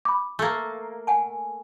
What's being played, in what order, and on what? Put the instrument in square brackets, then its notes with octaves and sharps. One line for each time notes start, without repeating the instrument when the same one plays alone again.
[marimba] B5 D6
[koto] A3 A#3
[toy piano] F#5 G#5 A5